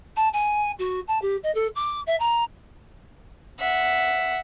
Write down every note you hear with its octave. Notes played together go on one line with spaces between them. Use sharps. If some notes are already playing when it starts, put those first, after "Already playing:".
A5
G#5
F#4
A5
G4
D#5
A4
D6
E5
A#5
E5 F#5